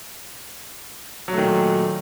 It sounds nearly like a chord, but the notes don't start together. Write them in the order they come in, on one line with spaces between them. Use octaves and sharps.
F#3 A3 D#3 A#2